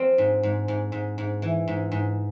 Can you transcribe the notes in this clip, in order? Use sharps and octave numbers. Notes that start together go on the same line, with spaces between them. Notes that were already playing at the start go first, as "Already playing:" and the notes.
Already playing: F3 C4
G#2
G#2
G#2
G#2
G#2
E3
G#2
G#2